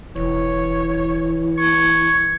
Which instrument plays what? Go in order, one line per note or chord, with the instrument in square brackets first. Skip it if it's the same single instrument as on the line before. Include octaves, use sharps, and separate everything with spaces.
[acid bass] E1 [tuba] E3 [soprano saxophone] C#5
[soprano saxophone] C#6 [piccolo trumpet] G#6